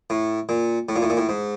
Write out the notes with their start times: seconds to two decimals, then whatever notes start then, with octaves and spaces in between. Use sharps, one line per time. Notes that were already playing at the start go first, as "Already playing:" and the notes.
0.10 A2
0.49 A#2
0.89 A2
0.96 A#2
1.02 A2
1.10 A#2
1.17 A2
1.29 G#2